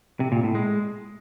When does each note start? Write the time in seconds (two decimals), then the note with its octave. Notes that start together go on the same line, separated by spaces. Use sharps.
0.20 C3
0.32 A#2
0.43 A2
0.55 G#3